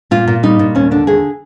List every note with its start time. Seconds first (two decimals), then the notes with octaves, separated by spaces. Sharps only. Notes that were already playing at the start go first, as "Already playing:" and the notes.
0.11 A#2 F4
0.28 A#2
0.43 G3 D#4
0.59 A#2
0.75 D#2 C#4
0.91 D3 D4
1.07 D#2 G#4